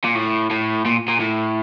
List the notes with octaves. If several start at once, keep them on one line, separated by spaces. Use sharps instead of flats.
A#2
A2
A2
A#2
A#2
A2